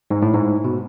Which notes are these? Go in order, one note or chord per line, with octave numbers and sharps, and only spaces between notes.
G#2
A2
G#2
B2